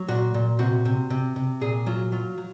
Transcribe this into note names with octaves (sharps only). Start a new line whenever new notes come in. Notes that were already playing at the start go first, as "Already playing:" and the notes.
Already playing: F#3
A#2 F#4
A#2
C3 F#4
C3
C3
C3
A#2 G#4
F#3 F4
F#3 F4
F#3